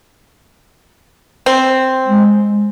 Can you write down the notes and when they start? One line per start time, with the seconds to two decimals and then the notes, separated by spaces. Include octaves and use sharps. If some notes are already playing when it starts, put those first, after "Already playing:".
1.46 C4
2.07 G#3